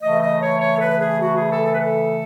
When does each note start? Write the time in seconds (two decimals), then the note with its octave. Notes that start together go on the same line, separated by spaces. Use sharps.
0.01 C#3 E3 A3 D#5
0.21 D#5
0.41 C#5
0.60 C#5
0.76 A4
0.80 B4
1.00 G#4
1.21 F#4
1.35 G#4
1.50 A4
1.64 A4
1.73 B4
1.79 A4